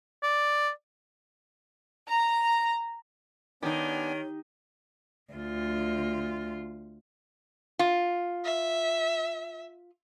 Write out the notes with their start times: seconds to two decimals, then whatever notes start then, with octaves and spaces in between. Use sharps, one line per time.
0.23 D5
2.08 A#5
3.63 D#3 B3 D4 D#4 G4 C#5 G#5
5.33 D2 F4
7.79 F4
8.45 E5